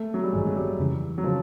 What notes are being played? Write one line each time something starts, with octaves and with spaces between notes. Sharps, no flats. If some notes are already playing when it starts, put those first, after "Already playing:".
Already playing: A3
F#3
G3
A1 G2 D#3 G#3
F#3
G3
F2 C#3 E3
F#3
C#3 F3